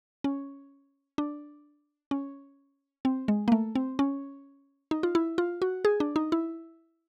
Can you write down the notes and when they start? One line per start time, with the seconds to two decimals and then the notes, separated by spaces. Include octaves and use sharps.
0.24 C#4
1.18 D4
2.11 C#4
3.05 C4
3.28 G#3
3.48 A#3
3.52 A3
3.75 C4
3.99 C#4
4.91 D#4
5.03 F4
5.15 E4
5.38 F4
5.62 F#4
5.85 G#4
6.00 D4
6.16 D#4
6.32 E4